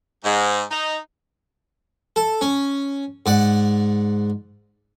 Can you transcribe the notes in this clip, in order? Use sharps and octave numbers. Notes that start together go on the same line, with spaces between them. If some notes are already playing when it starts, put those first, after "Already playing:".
G#2
D#4
A4
C#4
G#2 D5 F#5